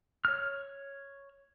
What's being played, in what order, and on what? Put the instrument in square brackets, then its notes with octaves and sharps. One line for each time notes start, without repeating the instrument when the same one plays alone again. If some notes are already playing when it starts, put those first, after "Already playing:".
[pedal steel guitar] C#5 F6